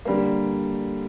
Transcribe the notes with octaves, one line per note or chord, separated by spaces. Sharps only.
D3 G3 A#3